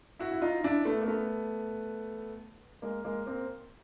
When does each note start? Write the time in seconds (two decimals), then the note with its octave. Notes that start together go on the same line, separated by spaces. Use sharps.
0.19 E4 F#4
0.31 E4
0.42 D#4 F4
0.64 D4 E4
0.85 A3 B3
1.02 A#3
1.08 A3 B3
2.82 G#3 A#3
3.04 G#3 A#3
3.27 A#3 C4